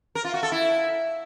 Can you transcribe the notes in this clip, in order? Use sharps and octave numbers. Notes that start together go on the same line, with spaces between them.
A#4
F4
F#4
A4
E4